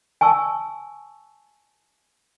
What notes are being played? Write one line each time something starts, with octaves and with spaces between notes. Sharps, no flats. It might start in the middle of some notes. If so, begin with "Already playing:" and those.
G#5 A5 C#6 E6